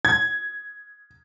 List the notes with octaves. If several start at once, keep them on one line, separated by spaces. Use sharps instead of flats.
G#6